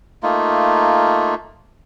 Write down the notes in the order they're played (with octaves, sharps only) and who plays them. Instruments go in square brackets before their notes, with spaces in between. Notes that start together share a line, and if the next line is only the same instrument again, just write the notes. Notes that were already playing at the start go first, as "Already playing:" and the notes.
[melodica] A3 A#3 D#4 F4